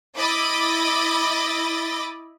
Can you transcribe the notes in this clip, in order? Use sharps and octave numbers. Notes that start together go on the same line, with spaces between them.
E4 D#5 B5 D6 A6